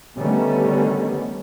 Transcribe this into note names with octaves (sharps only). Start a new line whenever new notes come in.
D3 D#3 G3 A3 B3 C#4